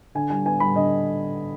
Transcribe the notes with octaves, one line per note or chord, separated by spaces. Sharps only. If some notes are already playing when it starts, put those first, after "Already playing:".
D3 G#5
G3 G#5
B3 G#5
G3 B5
D3 D#5